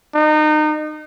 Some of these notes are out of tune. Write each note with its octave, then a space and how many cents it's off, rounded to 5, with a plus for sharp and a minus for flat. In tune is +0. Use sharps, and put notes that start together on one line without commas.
D#4 -30